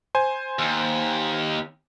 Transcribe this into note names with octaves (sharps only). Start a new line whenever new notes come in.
C5 G#5
D#2